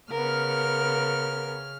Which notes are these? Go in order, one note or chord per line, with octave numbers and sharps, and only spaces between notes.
C#3 B3 A#4 F6